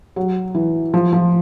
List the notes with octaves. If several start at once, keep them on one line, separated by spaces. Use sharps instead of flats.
F#3
E3
F3
F3